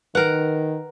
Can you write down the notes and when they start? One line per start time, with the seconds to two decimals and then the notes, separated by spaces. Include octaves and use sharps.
0.15 D#3 A#4 B4 F#5